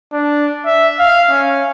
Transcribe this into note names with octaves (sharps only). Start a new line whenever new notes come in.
D4
E5
F5
C#4